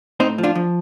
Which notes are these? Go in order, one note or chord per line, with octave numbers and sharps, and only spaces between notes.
A2 C4 D#4
F3
D4 F4
F3